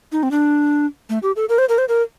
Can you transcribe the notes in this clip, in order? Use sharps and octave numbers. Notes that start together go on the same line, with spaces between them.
D#4
C4
D4
A3
G4
A4
A#4
C5
A#4
C5
A#4